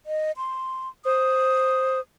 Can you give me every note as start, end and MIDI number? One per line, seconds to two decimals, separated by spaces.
0.06 0.32 75
0.37 0.88 84
1.05 2.00 72
1.05 1.99 87